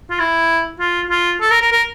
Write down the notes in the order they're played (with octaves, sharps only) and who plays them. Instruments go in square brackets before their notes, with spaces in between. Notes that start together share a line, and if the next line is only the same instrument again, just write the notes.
[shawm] F4
E4
F4
F4
A4
A#4
A#4
A#4